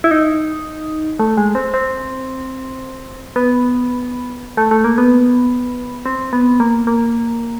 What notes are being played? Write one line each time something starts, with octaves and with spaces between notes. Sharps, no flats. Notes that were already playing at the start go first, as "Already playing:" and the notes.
E4
D#4
A3
G#3
C4
C4
B3
A3
A3
A#3
B3
C4
B3
A#3
A#3